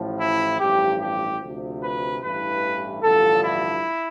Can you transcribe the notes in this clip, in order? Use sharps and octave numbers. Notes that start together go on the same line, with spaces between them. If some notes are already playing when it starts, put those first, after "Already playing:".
Already playing: A1 A2 F3
E4
A1 G2 F3 G4
G4
D2 C3 F3
B4
A1 G2 E3 B4
A1 G2 D3 F3 A4
E4